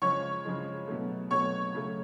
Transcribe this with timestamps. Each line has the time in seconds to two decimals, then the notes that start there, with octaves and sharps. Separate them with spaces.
0.02 C#3 F3 G#3 C#5 C#6
0.45 C#3 F3 G#3
0.87 B2 F#3 A3
1.31 B2 F#3 A3 C#5 C#6
1.74 C#3 F#3 A3